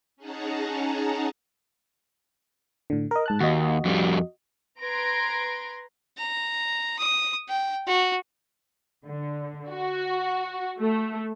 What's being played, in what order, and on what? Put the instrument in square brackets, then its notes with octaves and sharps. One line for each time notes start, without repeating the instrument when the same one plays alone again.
[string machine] C#4 D#4 G#4 F#5 A5 A#5
[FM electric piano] A2 D3
A#4 D#5
G#2 A5 F#6
[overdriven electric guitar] D#2 [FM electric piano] F#4 D#5
[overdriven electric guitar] F2 G3
[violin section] B4 A#5 C6 G#6 A#6 D7
[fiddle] A#5
D#6
G5
F#4
[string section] D3
F#4
A3